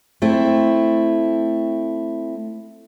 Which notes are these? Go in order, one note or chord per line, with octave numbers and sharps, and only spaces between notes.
A3 C4 E4